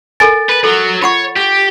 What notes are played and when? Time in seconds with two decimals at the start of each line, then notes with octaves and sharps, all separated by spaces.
0.20 A4 A#4 G#5 A6
0.49 B4
0.64 F#3 A4
1.02 F4 C#5 F#5 C#6
1.37 G4